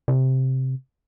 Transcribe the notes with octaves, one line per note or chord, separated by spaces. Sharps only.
C3